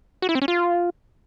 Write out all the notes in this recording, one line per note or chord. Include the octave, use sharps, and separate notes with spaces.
F#4
E4
C4
C#4
F4